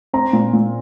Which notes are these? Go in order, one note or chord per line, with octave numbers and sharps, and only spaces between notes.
C4 A#5
A#2
A#2